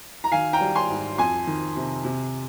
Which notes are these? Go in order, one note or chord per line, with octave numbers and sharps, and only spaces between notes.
A#5
D#3 F5 G#5
G5 A#5
G3
G#5 C6
G#2
F2 G#5 C6
D#3
C3
C3